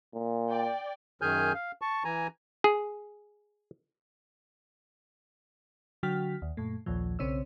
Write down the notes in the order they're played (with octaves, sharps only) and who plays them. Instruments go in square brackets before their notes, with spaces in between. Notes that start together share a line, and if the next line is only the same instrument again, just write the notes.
[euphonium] A#2
[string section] D5 G5
[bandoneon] F#2 D#3 G#4 G#5 F6 G6
F5
A5 C#6
E3 G#5 A#5
[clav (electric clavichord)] G#4
[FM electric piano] D3 F#3 F#4 G5 F6 B6
D#2
F#2 A#2 A3
A#1 D#2 A#2 F3
B1 C#3 C4 C#5 E6